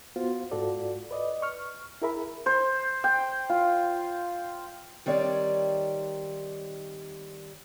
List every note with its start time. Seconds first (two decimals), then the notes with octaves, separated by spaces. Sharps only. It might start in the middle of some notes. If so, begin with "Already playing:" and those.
0.16 B3 F4 F#4 C5
0.51 G#2 F4 F#4 A4 D5
1.11 B4 D5 D#5
1.42 C#6 F6
2.02 E4 G#4 A#4 E5 B5
2.46 C5
3.04 G5
3.50 F4
5.06 D#3 G3 C4 C#5 D5